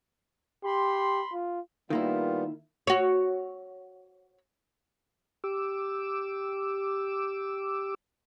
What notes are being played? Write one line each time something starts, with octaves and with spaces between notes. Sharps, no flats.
G4 B5 C6
F4
D#3 G3 A#3 B3 E4 F4
F#4 C#5
G4 D6 E6